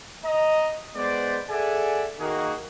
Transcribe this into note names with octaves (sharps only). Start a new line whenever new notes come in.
D#5 A#5
G#3 B3 B4 C5 D5
G#4 A4 D5 E5 F#5 G#5
D#3 A#3 F#4 G#4